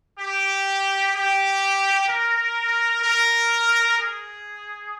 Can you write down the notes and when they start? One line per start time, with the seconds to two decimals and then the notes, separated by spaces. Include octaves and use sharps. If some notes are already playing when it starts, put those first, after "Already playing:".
0.19 G4
1.14 G4
2.08 A#4
3.02 A#4
3.97 G#4